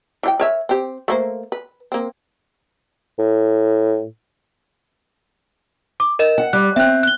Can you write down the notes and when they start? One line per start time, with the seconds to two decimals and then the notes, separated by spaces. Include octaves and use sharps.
0.23 E3 F4 G5
0.40 A#4 C#5 E5
0.69 C4 G4
1.08 A3 A#3 C5
1.52 B4
1.92 A#3 C4
3.19 A2
6.00 D6
6.19 A#4 D#5 E7
6.38 F#5
6.53 G3 F#6
6.76 C4 E5 F#6
7.03 F#6 G7